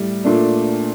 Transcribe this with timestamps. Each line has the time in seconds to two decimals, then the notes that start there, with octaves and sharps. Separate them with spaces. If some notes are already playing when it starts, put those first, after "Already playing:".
Already playing: A2 G3
0.24 A#2 A3 D4